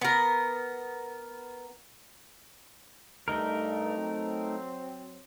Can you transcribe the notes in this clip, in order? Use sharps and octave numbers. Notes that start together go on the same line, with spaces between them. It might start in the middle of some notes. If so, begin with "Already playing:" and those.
B3 A#4
G2 A3 D#4 A#4
F#3 C4